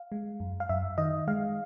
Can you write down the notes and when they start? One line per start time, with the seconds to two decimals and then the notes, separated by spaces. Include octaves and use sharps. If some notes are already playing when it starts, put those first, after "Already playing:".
Already playing: F5
0.12 G#3
0.40 F#2
0.60 F5
0.69 F#2 E5
0.98 D#3 D#5
1.28 G#3 F5